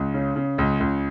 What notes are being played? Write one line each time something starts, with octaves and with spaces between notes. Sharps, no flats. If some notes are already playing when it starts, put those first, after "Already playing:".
Already playing: C#2
C#3
C#3
C#2
C#2